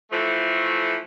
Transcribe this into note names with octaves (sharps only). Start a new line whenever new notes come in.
E3 F3 A3